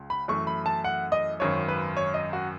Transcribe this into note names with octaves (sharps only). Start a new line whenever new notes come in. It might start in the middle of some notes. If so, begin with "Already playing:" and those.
Already playing: C#2 C#3
B5
F#2 E3 A3 C#6
B5
A5
F#5
D#5
G#1 F#2 D#3 C#5
B4
C#5
D#5
F#4